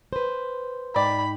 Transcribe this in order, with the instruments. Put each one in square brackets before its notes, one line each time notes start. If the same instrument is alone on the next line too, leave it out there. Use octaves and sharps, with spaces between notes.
[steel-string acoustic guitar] B4 C5
[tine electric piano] G#2 D#4 G5 [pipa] D5 [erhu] B5